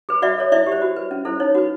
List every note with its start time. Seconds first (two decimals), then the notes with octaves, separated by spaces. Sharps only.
0.09 G#4 B4
0.22 F#4 D5 E5
0.38 A4 C#5
0.52 E4 D5 E5
0.67 G4
0.72 C5
0.82 F#4
0.96 B4
1.11 C#4
1.25 E4 A4 C5
1.40 D#4 C#5
1.55 F#4 B4